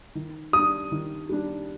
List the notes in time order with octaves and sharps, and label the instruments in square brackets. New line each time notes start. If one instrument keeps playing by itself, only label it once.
[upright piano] D#3
[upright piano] G3 D4 [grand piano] D#6
[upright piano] D#3
G3 D4